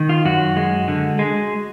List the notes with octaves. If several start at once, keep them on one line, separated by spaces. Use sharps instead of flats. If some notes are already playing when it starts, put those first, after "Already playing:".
Already playing: D#3
F4
F#2 F#4
G#3
D3
G#3